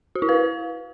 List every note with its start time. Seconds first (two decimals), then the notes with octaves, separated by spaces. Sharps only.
0.15 F#4
0.22 E4
0.29 B4